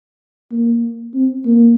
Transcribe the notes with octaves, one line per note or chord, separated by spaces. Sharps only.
A#3
C4
A#3